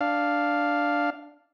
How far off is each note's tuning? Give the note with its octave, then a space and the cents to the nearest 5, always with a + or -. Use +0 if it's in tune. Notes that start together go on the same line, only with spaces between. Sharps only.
D4 +0 F5 +0